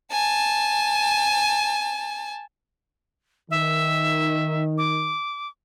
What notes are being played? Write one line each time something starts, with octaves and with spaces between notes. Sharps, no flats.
G#5 A5
D#3 E5
D6